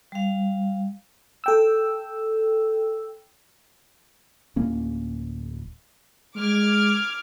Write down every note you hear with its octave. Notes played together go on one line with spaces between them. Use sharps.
G3 F5
A4 G5 E6
D1 A#3 C#4
G#3 D6 F6 G#6